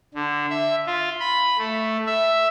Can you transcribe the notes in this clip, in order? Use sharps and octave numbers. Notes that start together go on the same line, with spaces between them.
D3
E5
F4
B5
A3
E5